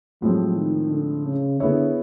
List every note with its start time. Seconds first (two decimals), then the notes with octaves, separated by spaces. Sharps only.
0.22 A2 F3 F#3 G#3 C4
0.57 D#3
0.90 D3
1.25 C#3
1.60 D3 B3 E4 G#4 C#5 E5